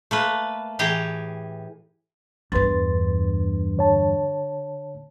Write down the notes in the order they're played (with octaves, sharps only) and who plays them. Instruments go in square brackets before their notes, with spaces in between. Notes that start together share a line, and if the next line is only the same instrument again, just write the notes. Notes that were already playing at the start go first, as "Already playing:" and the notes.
[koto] A3 A#3 B4
A2 E3 G4 G#4 G5 A#5
[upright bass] E2 G2 [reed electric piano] B4 C6 A6
[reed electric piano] D3 C#5 A5